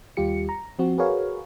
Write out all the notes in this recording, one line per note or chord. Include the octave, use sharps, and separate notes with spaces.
D#2 G3 F4 G4 C#7
A#5
F3 C4 F#4
F#4 G#4 A#4 B4 C#5 F5